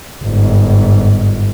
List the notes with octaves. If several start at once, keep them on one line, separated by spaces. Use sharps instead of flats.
G1 G#2